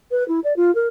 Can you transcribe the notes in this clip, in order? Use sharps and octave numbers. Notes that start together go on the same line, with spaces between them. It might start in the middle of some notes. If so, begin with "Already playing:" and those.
B4
E4
D5
F4
A#4